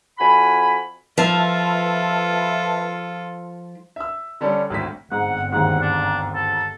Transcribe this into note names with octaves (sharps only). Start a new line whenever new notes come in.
F2 F#4 G#5 B5
F3 F4 A4 B4 E5 A5
E5 E6
D3 G3 C#4 D4 A4
G#1 D2 A2 B6
G1 G#2 C4 F#5
D#2 G#2 F#5
D4
A4